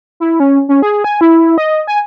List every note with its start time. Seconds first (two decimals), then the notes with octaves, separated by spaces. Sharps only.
0.20 E4
0.40 C#4
0.69 C#4
0.82 G#4
1.04 G#5
1.21 E4
1.58 D#5
1.87 G#5